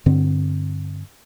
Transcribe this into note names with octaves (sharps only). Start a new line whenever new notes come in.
G2 D3 C4